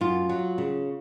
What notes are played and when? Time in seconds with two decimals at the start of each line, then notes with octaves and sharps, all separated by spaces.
0.01 F#2 F4
0.29 F#3
0.58 C#3